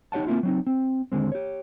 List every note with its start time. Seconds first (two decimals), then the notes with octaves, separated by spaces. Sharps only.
0.12 D#4 G4 C#5 F#5 A5
0.27 A#3 C4 E4 F4
0.43 F#3 C4 D#4
0.67 C4
1.12 D#2 D3 G#3 C4
1.32 G4 C#5